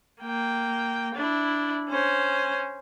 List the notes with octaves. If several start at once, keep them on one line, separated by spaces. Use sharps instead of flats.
A#3 G5
D4 E4
C#4 C5